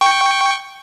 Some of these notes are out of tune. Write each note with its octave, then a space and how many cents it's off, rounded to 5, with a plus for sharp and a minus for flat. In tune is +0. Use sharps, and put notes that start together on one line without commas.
G5 +0 C#6 +0